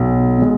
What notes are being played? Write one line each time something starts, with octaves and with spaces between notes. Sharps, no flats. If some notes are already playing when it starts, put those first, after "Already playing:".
Already playing: B1
B2 G#3